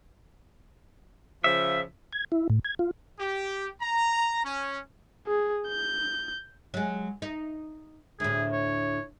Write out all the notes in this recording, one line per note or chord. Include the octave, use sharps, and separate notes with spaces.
C#3 F3 E5
G#6
E4
A2
G#6
F4
G4
A#5
C#4
G#4
G6
F#3 G#3
D#4
D2 A2 G#4
C#5